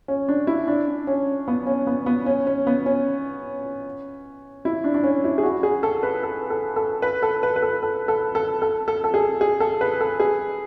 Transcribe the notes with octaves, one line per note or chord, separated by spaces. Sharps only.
C#4
D4
E4
D4
C#4
B3
C#4
B3
B3
C#4
C#4
B3
C#4
E4
D4
D4
C#4
E4
G#4
F#4
G#4
A4
B4
A4
A4
A4
B4
A4
B4
B4
A4
A4
A4
A4
A4
A4
A4
G#4
G#4
A4
B4
A4
G#4